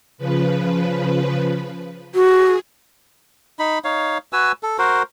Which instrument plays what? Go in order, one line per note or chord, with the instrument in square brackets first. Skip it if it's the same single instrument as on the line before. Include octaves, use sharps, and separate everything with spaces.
[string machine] C#3 F3 B4
[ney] F#4 [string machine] G#4
[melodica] D#4 B5
D#4 C#5 F5
F#4 B4 G#5 E6
A4
F#4 A#4 C5